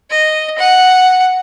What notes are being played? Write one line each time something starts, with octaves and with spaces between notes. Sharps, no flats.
D#5
F#5